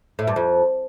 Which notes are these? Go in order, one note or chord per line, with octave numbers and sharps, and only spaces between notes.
A2
G2
F2